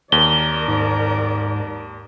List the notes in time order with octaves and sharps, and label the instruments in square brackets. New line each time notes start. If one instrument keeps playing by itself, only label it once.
[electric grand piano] D#2 [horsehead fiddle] A#4 D5 [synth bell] G7
[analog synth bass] G#2